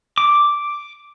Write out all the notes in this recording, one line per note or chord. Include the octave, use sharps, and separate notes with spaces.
D6